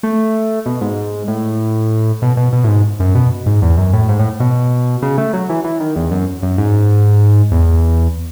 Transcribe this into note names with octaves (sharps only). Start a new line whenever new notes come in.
A3
B2
G#2
A2
B2
B2
B2
A2
G#2
F#2
B2
G#2
E2
F#2
A2
G#2
A2
B2
C#3
A3
F#3
E3
E3
D#3
E2
F#2
F#2
G#2
E2